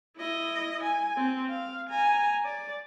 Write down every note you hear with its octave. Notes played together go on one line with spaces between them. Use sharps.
E4 D#5
G#5
C4
F5
G#5 A#5
D5